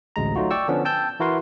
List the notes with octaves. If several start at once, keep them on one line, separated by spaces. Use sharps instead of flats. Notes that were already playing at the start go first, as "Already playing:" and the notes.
A1 D2 G#3 A#5
F#3 A3 D#4 F4 F#4
D5 G5 C#6 E6
D3 F3 B3 C#4 D4
G5 A5 E6 G6
E3 E4 F#4 A#4 B4 C6